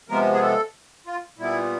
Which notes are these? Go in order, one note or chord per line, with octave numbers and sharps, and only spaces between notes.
C3 F3 G#3 B3 A#4
G#4
A4
F4
A#2 G3 B3 E4